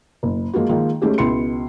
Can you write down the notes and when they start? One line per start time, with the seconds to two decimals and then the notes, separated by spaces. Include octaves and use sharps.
0.23 F#1
0.53 F3 G#3 A#3 F4 F#4
0.69 D#3 F3 G#3 A#3 D#4 F4
1.02 G#3 A3 C#4 G4 G#4
1.18 C#2 B2 E4 C6 C#7